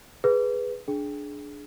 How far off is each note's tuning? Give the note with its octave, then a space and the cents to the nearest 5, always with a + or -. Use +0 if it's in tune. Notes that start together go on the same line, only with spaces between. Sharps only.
G#4 +0 B4 +0
D4 +0 G#4 +20